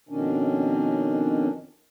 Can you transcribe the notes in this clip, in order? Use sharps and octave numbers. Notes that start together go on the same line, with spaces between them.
F2 B2 D#3 C#4 D4